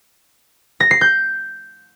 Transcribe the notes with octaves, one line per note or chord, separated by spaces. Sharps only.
A#6
C7
G6